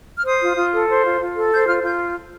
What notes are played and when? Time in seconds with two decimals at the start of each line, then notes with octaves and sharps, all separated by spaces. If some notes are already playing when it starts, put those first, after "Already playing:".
0.16 F6
0.26 C5 D#6
0.42 F4
0.57 F4
0.73 A4
0.89 C5
1.05 F4
1.20 F4
1.36 A4
1.52 C5 G6
1.68 F4 F6
1.83 F4 G6